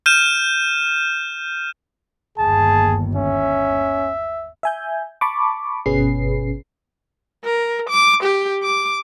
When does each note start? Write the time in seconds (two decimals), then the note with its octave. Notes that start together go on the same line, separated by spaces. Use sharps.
0.06 F6 G6 D#7 E7
2.38 G1 D#2 G#4 A5
3.16 C#4 E5
4.63 E5 G#5 G6
5.21 A5 B5 C#6 D6
5.86 G1 B2 C#4 G#4 B4 C7
7.45 A#4
7.89 D6
8.23 G4
8.63 D6